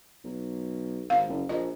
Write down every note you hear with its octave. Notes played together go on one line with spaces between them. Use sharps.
B1
G#1 F5
F#1
A#1 D#5